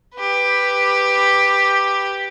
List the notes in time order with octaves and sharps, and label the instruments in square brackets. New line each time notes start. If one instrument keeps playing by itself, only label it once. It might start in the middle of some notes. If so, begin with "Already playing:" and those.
[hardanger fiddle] G4 B4